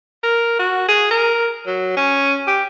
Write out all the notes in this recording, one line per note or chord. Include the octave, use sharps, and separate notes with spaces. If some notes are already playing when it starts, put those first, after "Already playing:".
A#4
F#4
G#4
A#4
F#3
C#4
G4